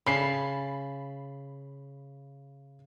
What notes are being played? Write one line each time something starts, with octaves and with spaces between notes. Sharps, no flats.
C#3 A5 B5 C7